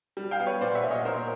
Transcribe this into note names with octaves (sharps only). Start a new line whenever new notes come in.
G3
F5 G5
B3
B4 C#5
A#2 C5 D5
E5 F#5
A#2
C#5 D#5
A#2 A#4 C5